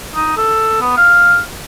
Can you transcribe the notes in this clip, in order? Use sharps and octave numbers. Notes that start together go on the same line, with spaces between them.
D#4
A4
B3
F5